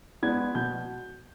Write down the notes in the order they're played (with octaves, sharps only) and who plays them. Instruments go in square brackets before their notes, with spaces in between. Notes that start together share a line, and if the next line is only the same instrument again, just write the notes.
[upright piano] G#3 B3 D4 G#6
B2 G6